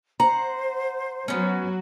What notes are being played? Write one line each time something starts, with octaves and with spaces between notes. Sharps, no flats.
C5 F#5 A#5
F#3 B3 C#4 F#4